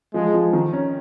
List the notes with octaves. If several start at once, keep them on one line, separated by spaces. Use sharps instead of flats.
F3 G#3
F3
D#3
C#4